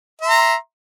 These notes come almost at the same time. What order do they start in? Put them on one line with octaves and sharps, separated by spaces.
E5 C6 A#5